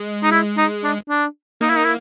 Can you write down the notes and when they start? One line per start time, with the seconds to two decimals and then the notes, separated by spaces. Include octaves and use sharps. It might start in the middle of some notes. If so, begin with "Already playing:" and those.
Already playing: G#3
0.23 D#4
0.31 E4
0.57 D#4
0.84 D4
1.09 D4
1.61 A#3 D#4
1.69 E4
1.77 D#4
1.85 E4